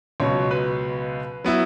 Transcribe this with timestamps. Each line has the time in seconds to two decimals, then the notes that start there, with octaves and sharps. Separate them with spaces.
0.20 C#2 B2 F#3 C#5
0.51 B4
1.44 F#3 B3 E4